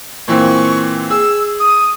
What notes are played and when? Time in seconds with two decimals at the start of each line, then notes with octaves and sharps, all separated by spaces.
0.28 A#2 E3 C4 C#6
1.10 G#4 E6
1.60 D#6